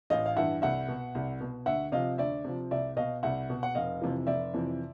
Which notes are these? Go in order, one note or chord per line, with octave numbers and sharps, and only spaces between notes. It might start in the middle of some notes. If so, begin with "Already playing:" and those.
A1 D#5 F5
F5
G2 E3 E5 F#5
C2 E5 F#5
B2
C2
B2
D2 E5 F#5
C3 F3 D#5 F5
D2 D5 E5
C3 F3
C2 D5 E5
B2 D#5 F5
C2 E5 F#5
B2
F#5
F1 D#5 F5
F2 C3 E3
F1 D5 E5
F2 C3 E3